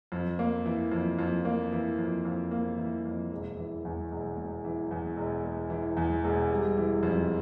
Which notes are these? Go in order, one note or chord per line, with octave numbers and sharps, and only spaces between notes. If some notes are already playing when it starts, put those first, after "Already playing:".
F2
A#3
E3
F2
F2
A#3
E3
F2
F2
A#3
E3
F2
E1
E3
E2
E1
E1
E3
E2
E1
E1
E3
E2
E1
G3
E3
F2